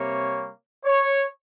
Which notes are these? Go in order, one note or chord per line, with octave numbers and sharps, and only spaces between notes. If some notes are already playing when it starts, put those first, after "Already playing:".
Already playing: C3 G3 A#3 C#5
C#5